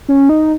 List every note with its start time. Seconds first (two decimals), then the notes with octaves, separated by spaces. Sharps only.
0.09 C#4
0.29 D#4